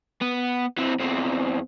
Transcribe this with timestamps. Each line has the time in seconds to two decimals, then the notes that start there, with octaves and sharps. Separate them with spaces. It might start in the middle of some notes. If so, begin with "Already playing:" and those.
0.21 B3
0.77 E3 C4
0.99 E2 C4